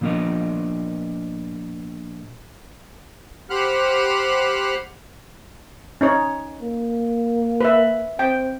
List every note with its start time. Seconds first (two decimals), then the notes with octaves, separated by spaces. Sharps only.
0.01 A#2 F3 B3 D4 A#4 D#5
3.50 G4 C5 F#5 B5 F6 F#6
6.01 C#4 D#4 C#5
6.62 A#3
7.61 B4 E5
8.19 C4 G5